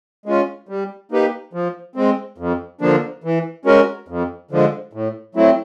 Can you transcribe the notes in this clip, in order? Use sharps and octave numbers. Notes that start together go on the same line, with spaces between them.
G#3 C#4 F4
G3
A#3 D#4 G4 B4
F3
G#3 C4
F2
D3 F3 A#3 D4
E3
G#3 C#4 F#4 A#4
F2
D3 F3 G#3
A2
F#3 A3 C4 E4